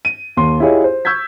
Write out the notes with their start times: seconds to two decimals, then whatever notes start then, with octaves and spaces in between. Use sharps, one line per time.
0.05 D#7
0.37 D#2 C6
0.60 E4 F4 G4 G#4 C#5 D#5
0.84 C5
1.05 C#6 E6 G6 G#6 B6